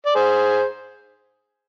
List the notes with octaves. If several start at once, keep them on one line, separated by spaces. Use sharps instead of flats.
D5
G#4 C5